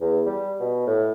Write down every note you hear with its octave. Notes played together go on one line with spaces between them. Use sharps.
E2
G3
B2
A2